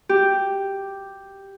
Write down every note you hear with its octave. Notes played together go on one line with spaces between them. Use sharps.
G4